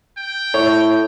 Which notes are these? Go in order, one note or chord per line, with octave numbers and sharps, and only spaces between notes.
G5
A2 C#5